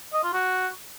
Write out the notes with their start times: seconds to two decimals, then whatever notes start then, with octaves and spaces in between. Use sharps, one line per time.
0.13 D#5
0.23 F4
0.33 F#4